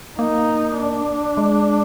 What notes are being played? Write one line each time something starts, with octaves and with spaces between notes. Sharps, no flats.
A#3 D#4
D4
G#3